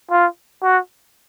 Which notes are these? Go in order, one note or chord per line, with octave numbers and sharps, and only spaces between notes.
F4
F#4